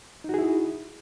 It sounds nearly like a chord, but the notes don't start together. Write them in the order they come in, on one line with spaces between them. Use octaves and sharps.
D#4 F#4 G#4 E4